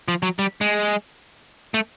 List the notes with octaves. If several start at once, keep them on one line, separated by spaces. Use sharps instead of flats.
F3
F#3
G3
G#3
A3